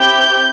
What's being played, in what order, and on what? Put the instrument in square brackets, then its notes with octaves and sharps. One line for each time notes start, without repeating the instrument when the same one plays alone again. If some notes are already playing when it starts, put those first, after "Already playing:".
Already playing: [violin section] C4 E4 G4 G6